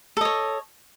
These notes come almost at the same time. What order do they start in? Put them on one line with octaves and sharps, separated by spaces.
A4 D#5 C#5